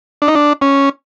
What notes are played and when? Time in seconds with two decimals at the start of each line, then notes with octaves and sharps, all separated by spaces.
0.22 D4
0.28 D#4
0.35 D4
0.61 C#4